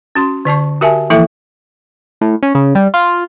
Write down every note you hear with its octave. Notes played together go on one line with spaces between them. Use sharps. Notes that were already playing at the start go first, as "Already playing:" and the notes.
C#4 F#4 C6
D3 D5 A5 C#6
F#4 G4 A#4 E5 G#5 A5
E3 F3 A#3 E4 A4 E5
A2
C#4
C#3
G3
F4